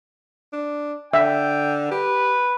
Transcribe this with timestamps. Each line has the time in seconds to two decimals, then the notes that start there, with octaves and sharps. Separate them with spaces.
0.53 D4
1.14 D3 E5 G5
1.91 G4 B4